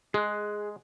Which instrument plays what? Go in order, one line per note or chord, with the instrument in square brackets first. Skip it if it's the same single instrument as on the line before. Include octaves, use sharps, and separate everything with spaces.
[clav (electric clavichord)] G#3 [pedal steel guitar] G#4 F#6